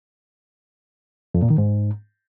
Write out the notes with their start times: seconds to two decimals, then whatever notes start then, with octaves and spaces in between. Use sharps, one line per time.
1.35 F2
1.42 A#2
1.50 D#3
1.58 G#2